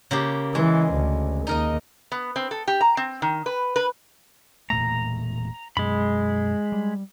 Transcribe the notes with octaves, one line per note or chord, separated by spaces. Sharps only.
C#3 A#3 G4
E3 G#3
D2
D#2 D#4 A#4 D#5
B3
C4
A4
G4
A#5
C4
D#3
B4
B4
E1 A#2 A3 A#5
F#2 B2 G#3 B5
G3